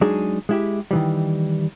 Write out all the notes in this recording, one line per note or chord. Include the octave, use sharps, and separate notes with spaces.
F#3 G#3 D4 D#4 G#4
G#3 E4 G4
D#3 E3 G3